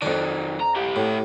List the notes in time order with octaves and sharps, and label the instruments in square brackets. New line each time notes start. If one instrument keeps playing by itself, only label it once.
[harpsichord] F2 D4 [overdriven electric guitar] D#3 F#3
[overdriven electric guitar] A#5
E4 G4
[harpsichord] A2